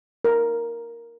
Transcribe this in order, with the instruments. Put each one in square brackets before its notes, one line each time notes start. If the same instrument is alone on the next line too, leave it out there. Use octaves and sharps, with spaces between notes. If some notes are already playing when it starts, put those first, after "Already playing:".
[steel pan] A#4